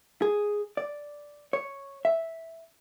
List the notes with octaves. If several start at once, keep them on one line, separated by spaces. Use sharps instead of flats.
G#4
D5
C#5
E5